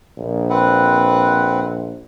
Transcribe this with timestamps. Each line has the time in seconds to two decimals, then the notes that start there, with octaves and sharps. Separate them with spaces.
0.17 A#1
0.50 C4 B4 F#5